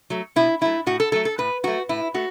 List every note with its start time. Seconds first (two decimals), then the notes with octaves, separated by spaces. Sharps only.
0.10 F#3 A3
0.36 B2 E4
0.61 F#3 A3 E4
0.86 A2 F#4
1.00 A4
1.12 F#3 A3 A4
1.25 A4
1.38 A2 B4
1.64 F#3 A3 F#4
1.89 A2 E4
2.14 A3 F#4